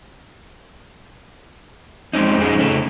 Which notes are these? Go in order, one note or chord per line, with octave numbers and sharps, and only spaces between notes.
G#3 C4 C#4 D#4
F2 G3 G#3 D#4 G#4
C#3 A3 C#4